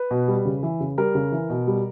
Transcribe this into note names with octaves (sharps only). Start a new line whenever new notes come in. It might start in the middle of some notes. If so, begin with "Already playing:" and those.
Already playing: B4
B2
G3
C#3
E3
C#3
G3 A#4
C#3
E3
B2
G3